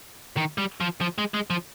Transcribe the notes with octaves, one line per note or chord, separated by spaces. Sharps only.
D#3
G3
F3
F3
G#3
G#3
F3